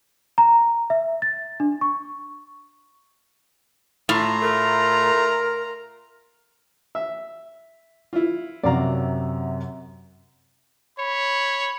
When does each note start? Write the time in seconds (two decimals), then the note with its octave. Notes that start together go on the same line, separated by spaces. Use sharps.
0.38 A#5
0.90 E5
1.22 A6
1.60 D4
1.81 C#6
4.09 A2 F4 A#5
4.42 A3 A#4
6.95 E5
8.13 E4 F4
8.63 F#2 C3 F#3 D5 F5 A#5
10.99 C#5 B5